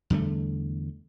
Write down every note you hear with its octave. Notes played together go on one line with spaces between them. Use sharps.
E2 D3 G3 A3